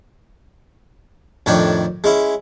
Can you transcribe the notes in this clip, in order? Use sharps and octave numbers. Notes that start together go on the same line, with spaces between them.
F2 A2 D#3 D4 C#5 G5
G#3 C#4 E4